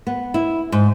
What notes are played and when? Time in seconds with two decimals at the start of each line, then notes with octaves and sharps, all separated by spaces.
0.07 B3
0.34 E4
0.72 G#2